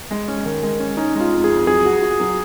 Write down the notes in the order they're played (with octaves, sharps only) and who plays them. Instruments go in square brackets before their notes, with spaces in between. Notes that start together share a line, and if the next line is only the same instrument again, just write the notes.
[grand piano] G#3
C#4
D#3
G#3
C#4
[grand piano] C#4 [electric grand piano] D#4
[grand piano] G#3
[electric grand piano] F4
[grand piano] F2
[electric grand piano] G#4
[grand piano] F2
[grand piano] F#3 [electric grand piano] G#4
[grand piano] F#4
F#4
F#3